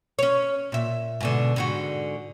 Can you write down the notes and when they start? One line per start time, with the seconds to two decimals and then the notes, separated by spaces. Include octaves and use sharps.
0.19 C#4 C#5
0.72 A#2 E5
1.21 G#2 B2 D3
1.56 G#2 D3 F#4